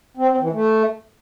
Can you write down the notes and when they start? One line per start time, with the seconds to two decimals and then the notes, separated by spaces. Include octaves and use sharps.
0.17 C4
0.29 C4
0.40 E3
0.52 A3